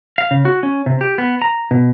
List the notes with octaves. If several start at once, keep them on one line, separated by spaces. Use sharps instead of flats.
F5
C#3
F#4
C#4
C3
G4
B3
A#5
B2